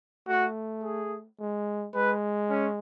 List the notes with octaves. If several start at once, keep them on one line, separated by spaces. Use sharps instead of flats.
A3 F#4
G#4
G#3
G#3 B4
C#4